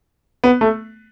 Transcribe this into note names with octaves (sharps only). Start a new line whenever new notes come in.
B3
A3